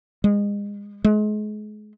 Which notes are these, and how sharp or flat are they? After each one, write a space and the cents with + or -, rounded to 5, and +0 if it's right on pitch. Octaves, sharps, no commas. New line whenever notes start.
G#3 -30
G#3 +35